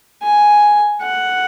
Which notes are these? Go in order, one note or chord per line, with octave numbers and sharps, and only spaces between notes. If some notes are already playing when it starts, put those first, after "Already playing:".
G#5
F#5